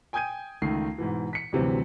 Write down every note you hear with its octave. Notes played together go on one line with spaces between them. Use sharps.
G5 G#5 D#6 G6 G#6 D#7
C#2 D#3 A3 C7
G#2 B2 E3
B6 C#7
D2 G2 C3 E3 F#3 C4